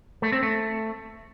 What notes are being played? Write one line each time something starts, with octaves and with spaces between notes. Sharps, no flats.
A3
C4
A3